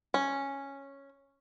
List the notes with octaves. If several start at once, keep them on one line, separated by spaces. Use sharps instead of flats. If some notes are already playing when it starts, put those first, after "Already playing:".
C#4